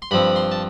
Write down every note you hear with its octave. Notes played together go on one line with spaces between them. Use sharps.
C6
G2 F3 C4 B5
C6
A5